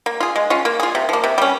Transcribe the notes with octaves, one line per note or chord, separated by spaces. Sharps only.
A#3
F4 G#4
G#3
C#4 F4
A#3
F4 G#4
C3
F3 A#3
C3
G3 C#4